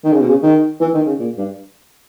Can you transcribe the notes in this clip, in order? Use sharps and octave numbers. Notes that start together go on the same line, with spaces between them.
D#3
C#3
B2
C#3
D#3
E3
D#3
C#3
A#2
G2